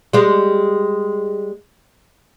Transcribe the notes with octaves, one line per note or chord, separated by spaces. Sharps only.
G3 G#3